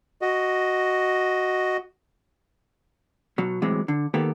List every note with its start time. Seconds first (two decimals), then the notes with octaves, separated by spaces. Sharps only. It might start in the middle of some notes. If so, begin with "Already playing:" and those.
0.22 F#4 D#5
3.38 B2 F#3
3.62 A2 C3 E3 F#3 G#3
3.88 D3
4.14 D#3 A#3 B3 G4 A4